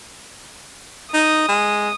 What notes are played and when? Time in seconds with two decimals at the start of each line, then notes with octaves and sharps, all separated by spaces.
1.14 D#4 D#6
1.48 G#3